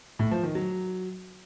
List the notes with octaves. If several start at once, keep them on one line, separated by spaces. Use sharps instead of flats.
A2
F3
D#3
F#3